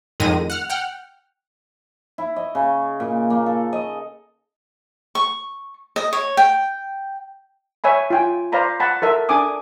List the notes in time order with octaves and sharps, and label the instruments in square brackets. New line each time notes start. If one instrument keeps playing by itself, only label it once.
[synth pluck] F2 A2 D#3 G#3 A#6 D#7
F#5 F6
F#5 G5 F6
[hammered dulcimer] E4
D#5
C#3
A#2
A#3
A4
D#5
[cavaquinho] C#6
D#5
C#5
G5
[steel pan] C#5 E5 G#5 B5
F4 G5 G#5
C5 D5 F5 A#5 B5
F#5 A5 B5
A4 A#4 E5
D4 A4 G#5 D6 D#6